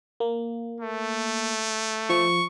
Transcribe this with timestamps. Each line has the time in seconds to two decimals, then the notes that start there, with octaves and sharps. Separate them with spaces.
0.20 A#3
0.80 A3
2.10 F3 C#6